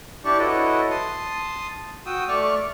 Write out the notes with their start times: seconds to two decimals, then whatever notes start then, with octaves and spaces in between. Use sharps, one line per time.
0.25 D4 E4 G4 D5 A5 C#6
0.39 E4 F#4 A4 B4 C#5 D#5
0.91 A5 C6 D#6
2.06 F#4 G5 D#6 E6
2.28 A3 D5 C#6 D6 F6